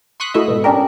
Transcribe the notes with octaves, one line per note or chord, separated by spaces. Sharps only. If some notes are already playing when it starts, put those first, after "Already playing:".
C6 C#6 D#6 F#6 B6
A3 E4 F#4 D#5 E5
G#2 B2
G3 C#4 D4 G4 A#4